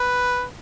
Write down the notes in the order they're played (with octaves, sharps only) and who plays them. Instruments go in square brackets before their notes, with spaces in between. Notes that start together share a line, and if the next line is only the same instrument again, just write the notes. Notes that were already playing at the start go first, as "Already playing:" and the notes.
Already playing: [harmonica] B4